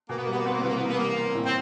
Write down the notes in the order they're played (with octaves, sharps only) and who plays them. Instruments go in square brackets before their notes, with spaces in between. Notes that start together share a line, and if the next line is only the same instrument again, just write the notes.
[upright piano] B2 [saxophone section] A#3
[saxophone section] B3
A#3
[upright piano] G3 [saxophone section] B3
[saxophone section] A#3
[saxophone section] B3 [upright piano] C4
[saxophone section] A#3
[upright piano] C2 [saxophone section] B3
[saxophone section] A#3
B3
[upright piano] E3 [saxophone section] A#3
[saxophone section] B3
[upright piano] G3 [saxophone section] A#3
[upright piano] C4
A2
[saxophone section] C4